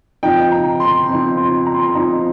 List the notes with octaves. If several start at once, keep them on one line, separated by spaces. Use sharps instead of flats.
F2 F3 D#4 G5
A#5
C6
F2 F3 D#4
C6
A#5
C6
A#5
F2 F3 D#4